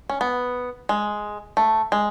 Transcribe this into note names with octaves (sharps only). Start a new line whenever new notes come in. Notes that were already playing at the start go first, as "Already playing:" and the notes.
C#4
B3
G#3
A3
G#3